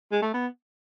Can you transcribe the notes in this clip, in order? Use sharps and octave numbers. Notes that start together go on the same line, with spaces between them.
G#3
A3
B3